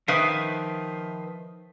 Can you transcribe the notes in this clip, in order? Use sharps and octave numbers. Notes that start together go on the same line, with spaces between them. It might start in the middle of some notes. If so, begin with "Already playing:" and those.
D#3 F3 B4 E5 F5